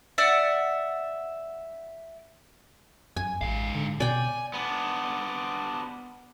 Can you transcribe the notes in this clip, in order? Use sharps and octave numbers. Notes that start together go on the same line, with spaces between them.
D5 E5 F#5
F#2 G#5
A1 G#2 F5
D3
B2 D5 G5 G#5
B3 D4